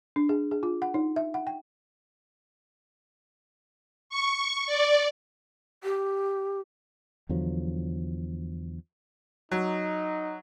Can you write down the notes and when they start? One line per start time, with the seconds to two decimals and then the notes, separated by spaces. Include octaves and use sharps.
0.16 D4
0.29 G#4
0.51 G#4
0.63 F4
0.82 F#5
0.94 D#4
1.16 E5
1.34 F#5
1.47 G5
4.10 C#6
4.67 D5
5.84 G4
7.29 E2 D3 F3 F#3
9.51 F#3 D#4